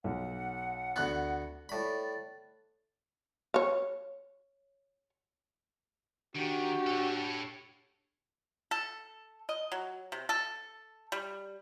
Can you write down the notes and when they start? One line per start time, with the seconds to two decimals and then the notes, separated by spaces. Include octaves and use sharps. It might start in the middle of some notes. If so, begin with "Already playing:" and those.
0.04 B1 F#5
0.96 D2 B3 F#6
1.69 A2 D5 B5
3.54 C#5 F5
6.36 D#3 D4 F#4 G4
6.87 A4 C#5
8.71 A4
9.49 D#5
9.72 F#3
10.12 C3
10.29 A4
11.12 G3